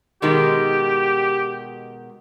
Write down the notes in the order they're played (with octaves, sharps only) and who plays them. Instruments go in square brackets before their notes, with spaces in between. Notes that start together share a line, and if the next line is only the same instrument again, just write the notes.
[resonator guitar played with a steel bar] B2 D#3 G#3 [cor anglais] G4